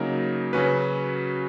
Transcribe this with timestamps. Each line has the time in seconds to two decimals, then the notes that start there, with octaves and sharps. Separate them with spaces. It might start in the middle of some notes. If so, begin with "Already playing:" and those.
Already playing: C#3 F#3 A#3 D#4 A#4
0.53 C#3 F#3 C#4 F#4 B4